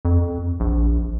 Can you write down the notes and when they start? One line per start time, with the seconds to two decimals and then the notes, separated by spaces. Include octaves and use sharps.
0.05 F2
0.60 A#1